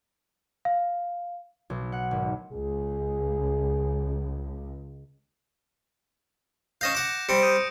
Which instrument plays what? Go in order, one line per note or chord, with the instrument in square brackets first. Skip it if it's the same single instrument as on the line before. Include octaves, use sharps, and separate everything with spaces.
[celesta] F5
[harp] B1
F#5
G#1
[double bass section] C#2 [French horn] G#4
[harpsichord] C#4 D#5 F5 [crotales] G6 A#6 E7
[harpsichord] F#5 D6 [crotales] A#6
[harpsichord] G3 C4 [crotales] C#7 D7
[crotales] D#6 G6 D#7